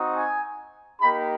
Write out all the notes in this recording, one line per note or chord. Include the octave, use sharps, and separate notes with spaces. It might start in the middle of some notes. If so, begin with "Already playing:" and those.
Already playing: C4 D#4 F#4
G#5
A#3 D#4 G4 B5